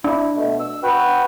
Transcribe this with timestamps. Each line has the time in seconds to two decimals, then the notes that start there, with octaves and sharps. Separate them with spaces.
0.04 D4 E4
0.35 B2 A3
0.60 E6
0.83 F#4 B4 G5